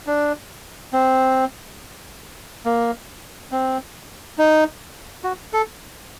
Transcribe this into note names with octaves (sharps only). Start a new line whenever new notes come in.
D4
C4
A#3
C4
D#4
F#4
A4